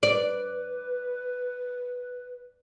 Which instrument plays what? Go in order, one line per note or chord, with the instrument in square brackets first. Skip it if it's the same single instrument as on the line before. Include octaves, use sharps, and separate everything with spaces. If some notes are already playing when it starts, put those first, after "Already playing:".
[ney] B4 [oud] D5